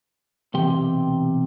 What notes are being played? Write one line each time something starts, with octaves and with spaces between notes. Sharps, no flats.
B1 C3 E3 G4 G5 C6